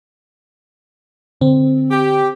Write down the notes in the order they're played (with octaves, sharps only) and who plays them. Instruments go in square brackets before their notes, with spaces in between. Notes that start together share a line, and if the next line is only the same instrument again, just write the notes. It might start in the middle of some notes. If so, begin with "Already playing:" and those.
[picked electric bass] D3 [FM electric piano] C4
[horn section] G4